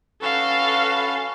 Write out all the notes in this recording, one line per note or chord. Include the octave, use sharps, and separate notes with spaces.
C#4 F#4 A4 B4 F5